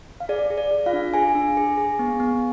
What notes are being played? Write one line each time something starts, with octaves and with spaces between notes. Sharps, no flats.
F5
G#4 D5
G#4
D5
G#4
F4 F5
D4
G#4 G#5
D4
G#4
G#4
B3
B3